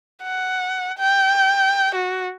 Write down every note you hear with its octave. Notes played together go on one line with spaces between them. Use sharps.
F#5
G5
F#4